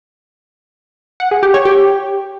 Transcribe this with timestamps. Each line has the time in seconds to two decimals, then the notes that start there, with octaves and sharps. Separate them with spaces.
1.20 F#5
1.31 G#4
1.43 G4
1.54 C#5
1.65 G4